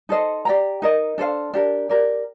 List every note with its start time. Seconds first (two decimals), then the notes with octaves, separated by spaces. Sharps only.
0.09 D#4 A4 C5 D#5
0.45 G4 D5 G5 A#5
0.82 D#4 A#4 D#5
1.18 D4 A4 C5 F5
1.54 D4 G4 A#4
1.89 G4 A#4 D5